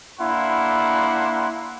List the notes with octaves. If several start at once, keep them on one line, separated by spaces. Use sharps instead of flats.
A#3 D4 E4 F#5 C6